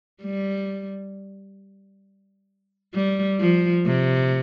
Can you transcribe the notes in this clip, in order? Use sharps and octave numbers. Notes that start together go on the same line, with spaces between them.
G3
G3
F3
C3